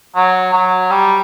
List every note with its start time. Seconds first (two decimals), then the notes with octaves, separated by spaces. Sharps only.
0.16 F#3
0.53 F#3
0.91 G3